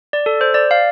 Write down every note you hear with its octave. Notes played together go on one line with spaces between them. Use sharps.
D5
A4
C5
D5
F5